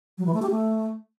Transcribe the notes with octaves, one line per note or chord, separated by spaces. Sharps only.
F#3
E3
A3
G4
A3